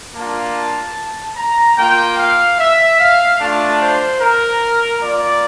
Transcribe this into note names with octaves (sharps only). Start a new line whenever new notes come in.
A#3 D4 F4 A5
A#5
A#3 F4 G5
F5
E5
F5
A3 D4 F4 A5
C5
A#4
A#3 F4 D5